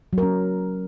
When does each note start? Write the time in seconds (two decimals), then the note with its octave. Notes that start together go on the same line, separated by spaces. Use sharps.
0.13 F#3
0.18 A#4
0.23 C#4